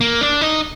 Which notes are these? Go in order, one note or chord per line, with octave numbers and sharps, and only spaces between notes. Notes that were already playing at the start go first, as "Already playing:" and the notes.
A#3
D4
D#4